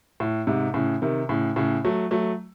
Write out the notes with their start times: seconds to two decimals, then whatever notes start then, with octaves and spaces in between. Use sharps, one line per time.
0.20 A2
0.47 G#2 C3
0.74 A2 C#3
1.02 C3 D#3
1.29 A2 C#3
1.56 A2 C#3
1.85 F#3 A3
2.11 F#3 A3